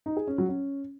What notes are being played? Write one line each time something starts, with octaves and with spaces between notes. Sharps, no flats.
D#4
G#4
C#4
F#3
C#4